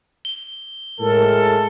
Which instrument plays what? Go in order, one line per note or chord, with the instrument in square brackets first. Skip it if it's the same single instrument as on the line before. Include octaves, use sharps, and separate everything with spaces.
[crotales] G7
[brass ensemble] A2 G#3 [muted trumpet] A4 [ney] A#4